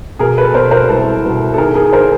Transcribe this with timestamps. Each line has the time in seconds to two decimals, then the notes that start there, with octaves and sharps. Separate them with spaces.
0.19 B2 G#4 A#4
0.37 A4 B4
0.54 B2 A#4 C5
0.71 A#4 C5
0.89 C2 A4 B4
1.24 B2
1.54 A4
1.58 D#3 G#4 A#4
1.75 G#4 A#4
1.93 D#3 A#4 C5